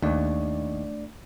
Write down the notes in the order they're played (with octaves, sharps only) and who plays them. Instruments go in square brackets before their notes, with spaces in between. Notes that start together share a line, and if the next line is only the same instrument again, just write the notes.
[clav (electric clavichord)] D#2 [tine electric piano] A3 D4 D5